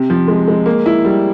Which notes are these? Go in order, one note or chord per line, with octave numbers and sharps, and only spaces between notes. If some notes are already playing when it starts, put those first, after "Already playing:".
Already playing: C3
F3
G#3
G#3
A#3
E4
G3